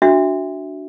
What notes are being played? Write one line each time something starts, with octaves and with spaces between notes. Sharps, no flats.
D4 F#4 E5